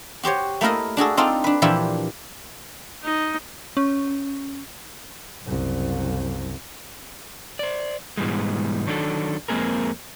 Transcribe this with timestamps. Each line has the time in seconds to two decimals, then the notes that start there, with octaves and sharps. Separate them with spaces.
0.23 F#4 G4 C5 C#5
0.61 A3 A#3 E4 A#4 D#5
0.97 D4 F#4 G#4 A4
1.17 C4 D4 D#4 F4 A4 D5
1.44 D4 B4
1.62 A#2 E3 F3 D4 E4 G4
3.04 D#4
3.77 C#4
5.44 F#1 C2
7.59 C5 D5
8.17 G#2 B2 E3 G3 G#3
8.87 D#3 F#3 D4 G4 A4
9.48 F2 G#3 A#3 C4 G#4 A#4